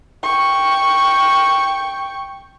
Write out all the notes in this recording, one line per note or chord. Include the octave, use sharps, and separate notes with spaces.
G5 C#6